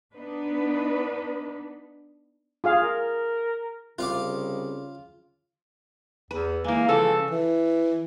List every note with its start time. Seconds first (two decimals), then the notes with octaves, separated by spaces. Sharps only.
0.14 B3 D4 D#4 B4
2.64 F4 G#4 F5
2.82 A#4
3.99 C2 C#3 F4 F5 D6
6.31 E2 B4
6.64 E3 G#3 A#3
6.88 C#3 F3 C#4 A4
7.31 E3